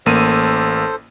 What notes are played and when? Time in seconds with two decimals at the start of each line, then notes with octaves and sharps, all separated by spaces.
0.06 A1 A#3 A4 C5 D#7